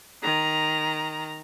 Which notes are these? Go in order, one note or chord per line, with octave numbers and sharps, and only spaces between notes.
D#3 A#5